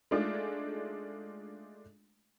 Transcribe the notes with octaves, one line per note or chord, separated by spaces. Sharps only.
G#3 A3 D4 D#4 F4 G#4